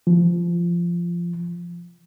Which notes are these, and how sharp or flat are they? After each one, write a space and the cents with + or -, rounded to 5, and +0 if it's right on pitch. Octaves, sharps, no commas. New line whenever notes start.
F3 -15